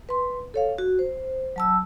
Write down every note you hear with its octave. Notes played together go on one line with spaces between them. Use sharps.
B4 C6
A4 C#5 F5
F#4
C5
F#3 A5 E6